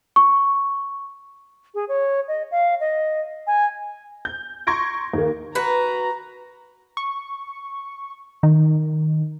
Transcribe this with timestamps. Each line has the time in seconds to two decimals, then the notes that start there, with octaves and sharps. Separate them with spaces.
0.16 C#6
1.75 G#4
1.88 C#5
2.28 D#5
2.51 F5
2.80 D#5
3.47 G#5
4.25 G6
4.67 A#5 C6 C#6 G#6 A#6 D7
5.14 D#2 A#3
5.55 F#4 B4 A#5
6.97 C#6
8.43 D#3